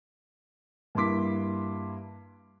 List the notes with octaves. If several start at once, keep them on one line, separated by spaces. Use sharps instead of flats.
G2 A#3 E4 C6 D6 B6